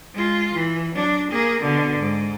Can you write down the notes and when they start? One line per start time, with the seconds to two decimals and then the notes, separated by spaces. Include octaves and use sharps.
0.14 G#3 F4
0.54 E3
0.94 F#3 D4
1.31 A#3 G#4
1.62 B2 D3
1.98 G#2